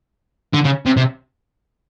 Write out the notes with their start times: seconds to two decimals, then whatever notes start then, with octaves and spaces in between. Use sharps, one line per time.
0.54 D3
0.65 C#3
0.86 C3
0.97 C3